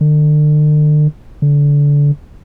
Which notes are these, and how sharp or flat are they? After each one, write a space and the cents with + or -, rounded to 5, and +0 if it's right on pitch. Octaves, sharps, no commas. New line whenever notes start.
D3 +40
D3 -25